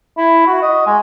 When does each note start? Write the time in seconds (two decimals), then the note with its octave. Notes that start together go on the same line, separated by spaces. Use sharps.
0.17 E4
0.47 F#4
0.62 D#5
0.86 G#3